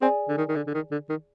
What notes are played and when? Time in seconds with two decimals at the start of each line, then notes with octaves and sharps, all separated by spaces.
0.01 C4 G#4 D5 G#5
0.29 D3
0.38 D#3
0.49 D#3
0.56 D3
0.67 D3
0.74 D#3
0.91 D3
1.09 D#3